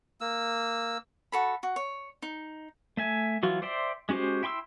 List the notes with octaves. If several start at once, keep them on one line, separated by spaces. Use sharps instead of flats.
A#3 E6
F#4 A4 B5
F#4
C#5
D#4
A3 E5 G#5
E3 F#3 F4 F#4
C5 D5 E5 G5 C6
G#3 C#4 F#4 G4 C5
E4 G5 C6 C#6 E6